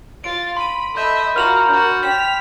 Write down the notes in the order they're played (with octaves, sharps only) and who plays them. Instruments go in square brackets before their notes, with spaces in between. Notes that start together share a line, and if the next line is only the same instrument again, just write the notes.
[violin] F4 A6 [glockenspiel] D7
[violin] B5 [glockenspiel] C6 D#7
[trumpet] A4 [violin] D#5 E5 [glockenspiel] B5 G6
[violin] F4 F#4 [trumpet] A#4 [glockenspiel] F6 F7 F#7
[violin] D4 F#4 [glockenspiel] G6
[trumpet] G5 [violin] B6 F7 [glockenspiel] E7